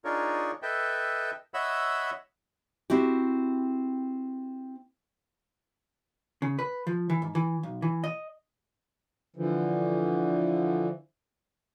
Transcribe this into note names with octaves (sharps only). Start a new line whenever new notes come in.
D4 D#4 F4 G#4 A#4 C#5
A4 B4 D#5 E5 G5
C#5 D#5 E5 F#5 B5 E6
C4 E4 F#4 G4
C#3
B4
F3
E3
G#2
E3
B1
E3
D#5
D3 E3 F3